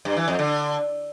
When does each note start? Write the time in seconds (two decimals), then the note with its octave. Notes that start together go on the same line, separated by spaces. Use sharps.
0.05 G2
0.16 E3
0.28 F2
0.39 D3